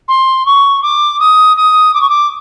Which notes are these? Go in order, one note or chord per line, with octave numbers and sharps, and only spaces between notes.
C6
C#6
D6
D#6
D#6
D6
C#6
D6